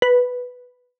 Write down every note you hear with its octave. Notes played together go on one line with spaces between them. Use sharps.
B4